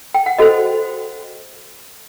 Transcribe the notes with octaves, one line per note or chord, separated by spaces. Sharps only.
G5
F#5
F#4 A4 C5 D#5